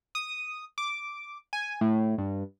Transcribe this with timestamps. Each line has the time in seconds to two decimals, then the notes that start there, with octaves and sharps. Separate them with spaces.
0.15 D#6
0.78 D6
1.53 G#5
1.81 A2
2.18 G2